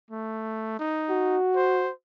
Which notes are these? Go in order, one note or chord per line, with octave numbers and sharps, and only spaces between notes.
A3
D#4
F#4
C5